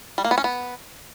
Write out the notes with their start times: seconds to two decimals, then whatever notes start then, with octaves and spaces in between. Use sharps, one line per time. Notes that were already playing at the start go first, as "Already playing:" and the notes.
0.18 G3
0.24 A#3
0.31 B3
0.38 C#4
0.44 B3